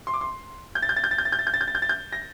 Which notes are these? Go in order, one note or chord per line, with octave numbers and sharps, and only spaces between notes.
C6
D6
C6
G6
A6
G6
A6
G6
A6
G6
A6
G6
A6
G6
A6
G6
A6
G6
A6
G6
A#6